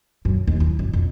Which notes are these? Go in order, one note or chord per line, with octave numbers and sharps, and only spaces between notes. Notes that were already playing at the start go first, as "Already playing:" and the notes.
F#2
D#2
E4
F#2
F2